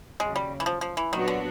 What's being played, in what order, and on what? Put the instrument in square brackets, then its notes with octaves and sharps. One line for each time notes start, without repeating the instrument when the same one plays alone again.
[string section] D#2 C#3 F#3 [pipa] G#3
[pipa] G3
E3
F3
F3
E3
[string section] A#2 F#3 B3 D4 F#4 [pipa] D#3
[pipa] D3